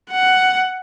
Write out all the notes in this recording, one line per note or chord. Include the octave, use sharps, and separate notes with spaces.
F#5